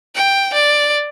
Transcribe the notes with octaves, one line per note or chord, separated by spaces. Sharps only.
G5
D5